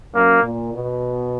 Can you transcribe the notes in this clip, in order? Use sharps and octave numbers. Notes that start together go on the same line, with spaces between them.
F#2 A#3
A#2
B2